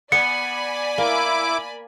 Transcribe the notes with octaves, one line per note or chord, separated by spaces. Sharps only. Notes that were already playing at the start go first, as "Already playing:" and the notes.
B3 D5 G#5 B5 C#7
A#3 E4 D6